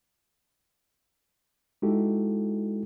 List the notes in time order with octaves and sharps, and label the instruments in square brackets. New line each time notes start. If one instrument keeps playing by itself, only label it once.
[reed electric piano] G#3 D#4 E4 F#4 G4 A4